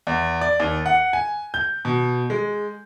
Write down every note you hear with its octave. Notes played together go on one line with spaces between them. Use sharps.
E2
D5
D#2
F#5
G#5
G6
B2
G#3